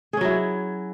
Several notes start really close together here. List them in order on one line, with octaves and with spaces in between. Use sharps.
G#4 C#4 F#3 E4